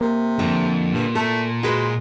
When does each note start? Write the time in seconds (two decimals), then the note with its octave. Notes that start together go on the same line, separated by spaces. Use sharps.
0.01 C3 A#3
0.39 F2 D3
0.93 G2 A#2
1.15 A3 A4
1.63 G#3 F#4 B4 C5